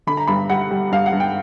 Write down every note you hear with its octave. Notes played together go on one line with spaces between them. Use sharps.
D3 B5
A#5
G2 B5
G3 F#5
G3
G2 F5
F#5
G2
G5